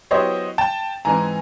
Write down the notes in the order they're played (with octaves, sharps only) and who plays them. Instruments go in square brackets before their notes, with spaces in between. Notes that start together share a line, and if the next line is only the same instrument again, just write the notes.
[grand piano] F#3 B3 E4 G4 C5 [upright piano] C#5 D#5
[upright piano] G5 A5
[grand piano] G#2 E3 G#3 C4 D#4 [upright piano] G#5 A#5